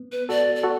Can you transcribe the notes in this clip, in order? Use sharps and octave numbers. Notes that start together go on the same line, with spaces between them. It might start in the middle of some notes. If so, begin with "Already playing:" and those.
Already playing: B3
B4
F#4 A4 D5
D5
F#4 A4